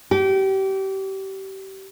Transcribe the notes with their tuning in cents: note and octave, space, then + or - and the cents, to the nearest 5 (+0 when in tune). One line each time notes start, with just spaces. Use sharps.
G4 -30